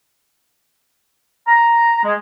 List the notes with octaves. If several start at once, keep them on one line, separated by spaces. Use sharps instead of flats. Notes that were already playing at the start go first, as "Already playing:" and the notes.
A#5
G#3